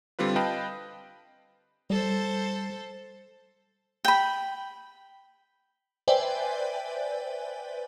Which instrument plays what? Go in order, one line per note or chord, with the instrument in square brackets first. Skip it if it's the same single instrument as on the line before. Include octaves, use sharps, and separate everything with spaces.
[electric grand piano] D3 G3 C4 F4 B4
B4 D#5 F5 G5 A5 B5
[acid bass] G3 [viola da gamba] A4 C5
[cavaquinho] G5 B5
[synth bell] B4 C5 D5 E5 G5 G#5